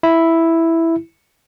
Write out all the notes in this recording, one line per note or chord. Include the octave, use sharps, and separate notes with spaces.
E4